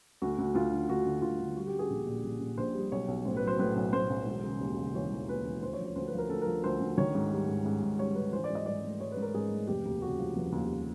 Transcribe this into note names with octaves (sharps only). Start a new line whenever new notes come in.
D2 F#4
D2
D2 F4
D3
D2 F#4
D3
D2 F4
D3
G3 F#4
G4
G3
G#4
A#1
A#2
A#1
A#1
A#1 C5
G3
B1 C#5
B1
A2 C5
B4
F#3
C5
A2 B4
B1
A2 C5
B1
E1
C#3
D#2
C#3
E3 C#5
E3
D#2 B4
E3
D2 C5
C#5
F3
C#5
D2 C5
B4
F3 A#4
D2 A4
A#4
F3
D2 C5
D2
D#3 C#5
G#2
G3
G#2
G#2
G#2
G3 C#5
G#2 B4
E3 C5
D5
G#2
D#5
G#2 D5
A3
G#2 C#5
B4
G#2
A#4
G#2 G#4
A3
F1 G4
D#2
C#3 F#4
F3
F1
D#2